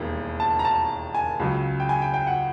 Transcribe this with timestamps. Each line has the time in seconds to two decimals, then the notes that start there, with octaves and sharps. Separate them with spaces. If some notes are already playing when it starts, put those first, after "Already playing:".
Already playing: E1 D#2 D#3 G3
0.40 A5
0.59 A#5
0.65 A5
1.15 G#5
1.40 C#2 C#3 F#3
1.80 G5
1.89 G#5
2.02 G5
2.14 G5
2.27 F#5